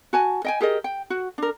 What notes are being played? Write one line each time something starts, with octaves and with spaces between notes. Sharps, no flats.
F#4 G#5 A5
D#5 G5 G#5
G4 G#4 A#4 D#5
G5
F#4
D4 A#4